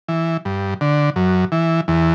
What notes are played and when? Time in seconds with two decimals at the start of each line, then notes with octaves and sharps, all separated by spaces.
0.08 E3
0.45 G2
0.81 D3
1.16 F#2
1.52 E3
1.88 E2